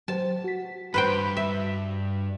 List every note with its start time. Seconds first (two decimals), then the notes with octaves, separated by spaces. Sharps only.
0.08 F#3 G4 C5 A5
0.44 F#4 B6
0.94 G2 B4 C5 G5
1.37 E5